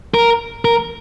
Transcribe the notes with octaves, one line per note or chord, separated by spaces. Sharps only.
A#4
A#4